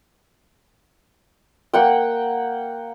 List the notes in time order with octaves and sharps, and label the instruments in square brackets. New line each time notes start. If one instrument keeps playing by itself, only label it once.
[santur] A#3 F#5 G5